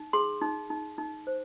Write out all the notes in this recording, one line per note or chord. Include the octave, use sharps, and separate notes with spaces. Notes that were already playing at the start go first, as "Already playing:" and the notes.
Already playing: D#4
G#4 C6
D#4
D#4
D#4
C5